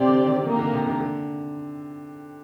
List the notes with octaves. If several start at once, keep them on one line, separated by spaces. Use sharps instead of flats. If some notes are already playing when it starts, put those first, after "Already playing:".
Already playing: C3 C4 G4 D5
D3
D#3
D#3 A#3 D#4 A#4
D3
C3
D3
D3